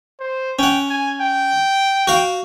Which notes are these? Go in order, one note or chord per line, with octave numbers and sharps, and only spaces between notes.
C5
C#4 F#5 G5
G#5
G5
F#4 F5